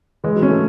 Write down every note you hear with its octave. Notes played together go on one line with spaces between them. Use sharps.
E3 G#3
F#3
C#4
A3